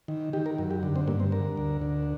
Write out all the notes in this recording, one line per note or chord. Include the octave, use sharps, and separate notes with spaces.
D#3
D#3 G4
A#4
F#2
G4
D3
C4
G2 A#3
C4
D3 A#4
D2
D3